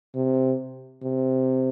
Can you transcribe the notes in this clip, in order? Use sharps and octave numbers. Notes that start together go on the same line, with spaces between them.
C3
C3